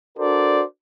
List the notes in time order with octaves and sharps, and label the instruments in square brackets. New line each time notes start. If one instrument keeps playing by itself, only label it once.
[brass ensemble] D4 F#4 A4 A#4 C5 D5